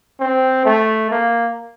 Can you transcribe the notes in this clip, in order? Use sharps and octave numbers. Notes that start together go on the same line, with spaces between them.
C4
A3
A#3